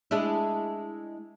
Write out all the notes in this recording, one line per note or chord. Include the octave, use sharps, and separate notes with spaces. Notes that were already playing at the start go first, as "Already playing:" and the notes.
G#3 D4 E4